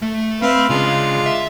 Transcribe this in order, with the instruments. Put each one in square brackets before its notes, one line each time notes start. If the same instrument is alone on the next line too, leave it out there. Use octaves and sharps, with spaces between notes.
[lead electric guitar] A3
[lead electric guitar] C4 [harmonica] B4 E5 F5
[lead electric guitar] C#3 [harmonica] G#3 D4 F4
[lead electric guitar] E5